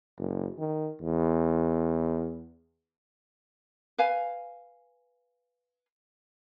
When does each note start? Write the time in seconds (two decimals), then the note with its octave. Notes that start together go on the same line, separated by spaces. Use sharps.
0.18 F#1
0.58 D#3
1.02 E2
3.98 B4 F5 G#5